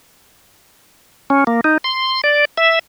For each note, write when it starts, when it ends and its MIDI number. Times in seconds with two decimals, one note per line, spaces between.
1.30 1.44 61
1.47 1.61 58
1.64 1.77 63
1.84 2.21 84
2.24 2.45 74
2.58 2.79 76